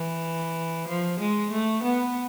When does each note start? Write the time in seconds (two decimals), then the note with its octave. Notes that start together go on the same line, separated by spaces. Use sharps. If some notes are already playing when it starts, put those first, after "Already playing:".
Already playing: E3
0.88 F3
1.20 G#3
1.52 A3
1.83 B3